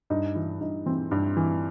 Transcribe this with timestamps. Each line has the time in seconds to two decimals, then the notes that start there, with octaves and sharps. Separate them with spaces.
0.10 G2 D#4
0.35 E3 E4
0.61 G2 D#4
0.86 E3 C4
1.11 G2
1.37 E3